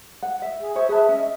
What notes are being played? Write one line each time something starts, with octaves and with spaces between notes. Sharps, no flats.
F#5
E5
G#4
C5 C#5 E5
G#4 B4 E5 A5
C#4 D#5